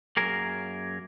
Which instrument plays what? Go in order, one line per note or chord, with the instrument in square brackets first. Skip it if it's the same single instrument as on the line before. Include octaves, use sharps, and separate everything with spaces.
[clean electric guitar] F#2 D#3 F#3 A#3 G#4 A#4